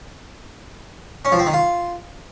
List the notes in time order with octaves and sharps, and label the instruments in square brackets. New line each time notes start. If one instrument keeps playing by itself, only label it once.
[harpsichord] C#4
F3
C4
D#3
F4